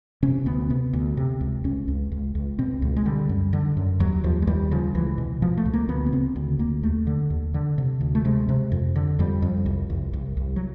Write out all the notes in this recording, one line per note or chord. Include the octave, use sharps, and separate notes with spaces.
C3 C#4
D2 B3
C3 B3
D2
C3
C#2
C#2 C#4
C#2
C#2
C#2
B2 C4
C#2
G#3
D3 G3
F#2
D3
F#2
D#2 F#3
D#2 F3
G#3
D#2 G3
C#3 F3
C#2 E3
B2
B2 F3
A3
C#2
A#3
D2 B3
B3
C#3 C4
D2
D2 A#3
D#2 A3
D3
D#2
D3
C3
D2
A3
C3 G#3
C3
F2
D3
F2 G3
F2
C2
C2
C2
C2
F#3